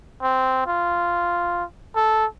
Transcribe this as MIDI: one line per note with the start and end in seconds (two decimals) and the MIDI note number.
0.22 0.66 60
0.67 1.64 65
1.96 2.26 69